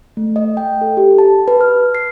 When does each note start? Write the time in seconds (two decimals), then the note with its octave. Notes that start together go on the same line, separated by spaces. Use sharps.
0.17 A3
0.36 D#5
0.57 G5
0.81 A4
0.97 G4
1.18 A5
1.48 B4
1.61 F6
1.95 C7